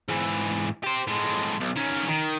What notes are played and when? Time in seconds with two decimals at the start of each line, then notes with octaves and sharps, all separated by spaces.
0.08 G#2 E3
0.84 G4 C5
1.07 A2 G#3
1.60 B1
1.76 D#3 C#4
2.08 D#3